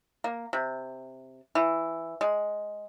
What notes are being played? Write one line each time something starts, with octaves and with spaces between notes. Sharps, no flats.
A#3
C3
E3
G#3